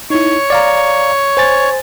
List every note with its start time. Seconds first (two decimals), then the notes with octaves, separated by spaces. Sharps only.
0.10 D#4 E4 C#5
0.50 D5 F5 A#5
1.37 C5 G#5 A6